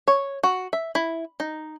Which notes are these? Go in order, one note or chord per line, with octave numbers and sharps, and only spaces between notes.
C#5
F#4
E5
E4
D#4